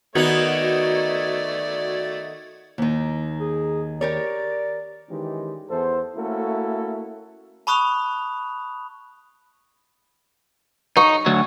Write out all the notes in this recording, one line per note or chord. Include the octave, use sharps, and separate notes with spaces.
D#3 A3 B3 D#4 F#4 D5 G#6
D#2 D#3
G#4
G4 A#4 C#5 D5
D#3 E3 G#3 C#4 G4
E2 A4 C5
A3 A#3 C#4 E4 F#4 A4
A5 B5 C#6 D#6 F#6 F7
D#4 C#6
D2 F#3